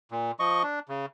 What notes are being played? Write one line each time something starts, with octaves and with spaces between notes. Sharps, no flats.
A#2
F3 D#5 C#6
D4
C#3